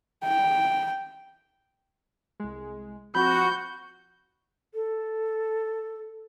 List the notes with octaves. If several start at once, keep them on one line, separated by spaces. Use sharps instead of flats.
G5
C2 G#3
F3 C4 F#4 B5 G6
A4